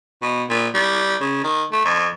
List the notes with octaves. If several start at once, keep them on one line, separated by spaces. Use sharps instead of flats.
B2
A#2
G3
C#3
D#3
A3
F2